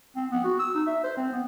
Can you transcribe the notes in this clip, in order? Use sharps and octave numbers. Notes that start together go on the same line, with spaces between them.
C4
B3
F#4
E6
D#4
E5
C5
C4
B3